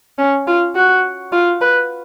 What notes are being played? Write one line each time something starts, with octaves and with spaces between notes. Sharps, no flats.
C#4
F4
F#4
F4
B4